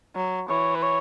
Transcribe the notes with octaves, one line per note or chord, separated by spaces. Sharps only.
F#3
E3 C#5
B4
C#5